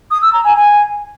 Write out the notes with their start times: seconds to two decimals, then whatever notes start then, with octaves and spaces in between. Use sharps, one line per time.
0.11 D#6
0.22 E6
0.33 A#5
0.44 G#5
0.55 G#5